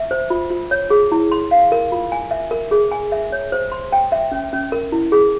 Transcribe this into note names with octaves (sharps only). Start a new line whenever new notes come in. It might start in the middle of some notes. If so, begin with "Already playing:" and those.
Already playing: E5
C5
F4
F4
C#5
G#4
E4
C6
F5
A#4
F4
G#5
E5
A#4
G#4
G#5
E5
C#5
C5
C6
G5
E5
C#4
C#4
A#4
E4
G#4